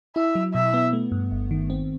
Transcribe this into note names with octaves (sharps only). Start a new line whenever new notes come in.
E4 E5
F#3
B2 E5
B3
A3
G2
G1
D#3
C4